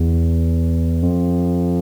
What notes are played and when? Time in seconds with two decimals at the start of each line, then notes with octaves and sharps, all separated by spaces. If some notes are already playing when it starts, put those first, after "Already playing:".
Already playing: E2
1.03 F2